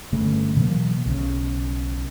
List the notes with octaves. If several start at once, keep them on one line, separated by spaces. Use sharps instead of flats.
G1 C#3 A3
B2 E3 F#3 A#3
B1 C#3